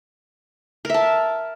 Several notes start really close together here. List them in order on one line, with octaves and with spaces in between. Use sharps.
A#4 E5 A5